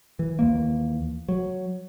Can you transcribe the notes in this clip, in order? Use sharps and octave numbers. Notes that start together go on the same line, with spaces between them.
E3
D#2 E3 A#3
F#3